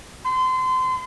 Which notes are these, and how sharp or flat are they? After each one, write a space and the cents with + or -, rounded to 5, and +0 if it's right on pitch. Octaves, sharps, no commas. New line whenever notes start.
C6 -30